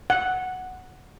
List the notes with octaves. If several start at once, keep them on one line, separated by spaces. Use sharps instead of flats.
F#5